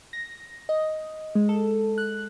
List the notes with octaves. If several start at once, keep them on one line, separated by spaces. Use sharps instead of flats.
A#6
D#5
G#3
A4
F#6